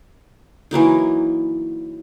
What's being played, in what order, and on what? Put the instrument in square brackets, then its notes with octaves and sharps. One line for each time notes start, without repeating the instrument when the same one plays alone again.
[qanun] E3 F#3 A#3 D#4